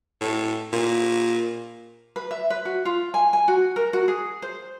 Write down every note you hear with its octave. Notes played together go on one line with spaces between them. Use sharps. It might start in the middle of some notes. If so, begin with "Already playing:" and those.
A2
A#2
B4
E5
B4
F#4
F4
G#5
G#5
F#4
A#4
F#4
G#4
C5